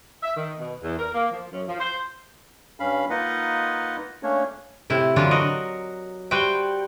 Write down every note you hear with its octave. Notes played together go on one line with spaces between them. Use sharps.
E5
D#3
B2
E2
A#4
A#3
F3
F#2
F3
C5
G2 C#4 F5 B5
A#3 D#4 F4 B4 D#5 F#5
A3 A#3 C#4 D4 C#5
A2 C3 E4
D3 E3 F#3 D4 F4
F#4 A#4 D#5
G3 F#4 B4 C5 G5